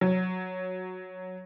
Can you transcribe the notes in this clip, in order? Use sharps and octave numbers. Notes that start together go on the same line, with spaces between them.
F#3